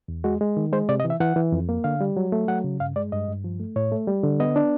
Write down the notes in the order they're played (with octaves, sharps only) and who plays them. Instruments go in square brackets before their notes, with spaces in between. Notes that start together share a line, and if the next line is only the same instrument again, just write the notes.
[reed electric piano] E2
G#3 F#4
G#3
D#3
G#3 C5
C3 D5
D#5
E3
E5
E3 F#5
E3
F2
A#3
D3 F5
G3
F#3
A3
F#3 F#5
C#3
G2 F5
G#3 D5
G2 D#5
G2
F3
A3
A2 C#5
A3
G3
D3
B3 D#5
D4